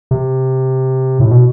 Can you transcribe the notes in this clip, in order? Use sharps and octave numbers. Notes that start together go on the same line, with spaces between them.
C3
A2
B2